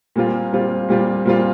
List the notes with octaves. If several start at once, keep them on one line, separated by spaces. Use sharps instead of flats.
A#2 G3 C4 F4
A#2 G3 C4 F4
A#2 G3 C4 F4
A#2 G3 C4 F4